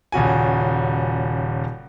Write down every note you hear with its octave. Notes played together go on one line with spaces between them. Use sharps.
D#1 C#3 F#4 G#5